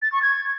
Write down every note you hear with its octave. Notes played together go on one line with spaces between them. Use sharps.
A6
C#6
G#6